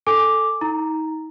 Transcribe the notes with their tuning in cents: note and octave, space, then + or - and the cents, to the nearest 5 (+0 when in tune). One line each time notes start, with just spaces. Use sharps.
A4 +0 G#5 +0 D6 +0
D#4 +30 A#5 +0